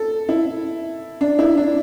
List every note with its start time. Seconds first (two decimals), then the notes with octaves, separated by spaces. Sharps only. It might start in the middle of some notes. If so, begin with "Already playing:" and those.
Already playing: A4
0.29 E4
1.21 D4
1.39 E4
1.57 D4